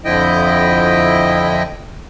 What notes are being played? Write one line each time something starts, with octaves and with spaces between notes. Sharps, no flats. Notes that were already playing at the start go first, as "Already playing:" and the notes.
F2 D3 F3 E4 D#5 G5